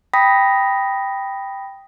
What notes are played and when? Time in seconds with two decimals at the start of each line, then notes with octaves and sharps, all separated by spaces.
0.14 G5 B5 D#6 A#6 B6